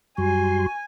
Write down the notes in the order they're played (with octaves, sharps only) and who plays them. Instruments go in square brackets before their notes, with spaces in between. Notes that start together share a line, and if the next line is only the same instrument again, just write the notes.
[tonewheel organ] F#2 G3 C6 [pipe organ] F#4 [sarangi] G#5